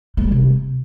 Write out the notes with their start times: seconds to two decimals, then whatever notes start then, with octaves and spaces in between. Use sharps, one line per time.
0.17 A3
0.24 G3
0.31 C3